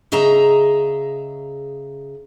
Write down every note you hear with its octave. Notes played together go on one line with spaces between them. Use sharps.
C#3 G#4 D#5 E5 A#5